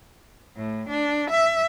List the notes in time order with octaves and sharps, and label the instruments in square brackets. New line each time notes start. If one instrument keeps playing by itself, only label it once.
[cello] A2
D4
E5